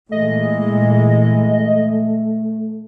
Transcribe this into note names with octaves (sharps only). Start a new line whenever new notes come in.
A#2 E3 G#3 A3 D#5